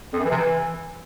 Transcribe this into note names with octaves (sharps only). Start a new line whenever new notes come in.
F2
F#2
E3
C3
E3